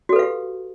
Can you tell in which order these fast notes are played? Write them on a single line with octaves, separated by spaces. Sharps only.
F#4 A4 B4 F5 G4